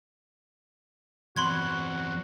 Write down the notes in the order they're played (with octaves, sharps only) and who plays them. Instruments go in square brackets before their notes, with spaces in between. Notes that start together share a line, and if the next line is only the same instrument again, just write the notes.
[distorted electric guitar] E2 C4 [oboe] F#4 [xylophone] B5 C6 G#6